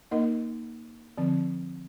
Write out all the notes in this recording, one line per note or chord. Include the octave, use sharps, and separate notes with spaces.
A#3 D#4 A#4 D#5
D3 F3 C4